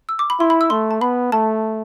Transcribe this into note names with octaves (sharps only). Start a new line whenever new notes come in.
E6
D6
B5
E4 C6
B5
E6
A3 C6
A5
B3 B5
A3 A5